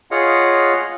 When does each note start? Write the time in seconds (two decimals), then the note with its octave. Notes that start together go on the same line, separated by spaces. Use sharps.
0.11 F4 G#4 C#5 D#5 F5 F#5